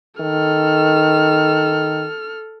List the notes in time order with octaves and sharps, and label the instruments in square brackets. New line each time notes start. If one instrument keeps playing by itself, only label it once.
[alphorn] D#3 [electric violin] A4 F6